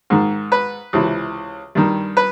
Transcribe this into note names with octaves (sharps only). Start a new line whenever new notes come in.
G#2 D#3
B4
C#2 C3 E3
G2 D#3
B4